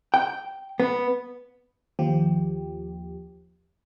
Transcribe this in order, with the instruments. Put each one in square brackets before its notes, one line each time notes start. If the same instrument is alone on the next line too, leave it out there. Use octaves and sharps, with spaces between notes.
[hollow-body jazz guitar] G5
B3
[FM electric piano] D#2 F3 G4